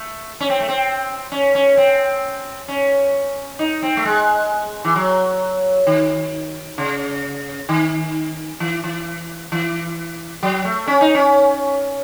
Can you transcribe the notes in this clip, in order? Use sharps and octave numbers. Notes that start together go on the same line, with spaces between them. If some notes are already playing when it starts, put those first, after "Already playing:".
Already playing: A3
C#4
C4
A3
C4
C#4
C#4
C4
C#4
D#4
C4
A3
G#3
E3
F#3
D#3
C#3
D#3
E3
E3
E3
F#3
A3
C#4
D#4
C#4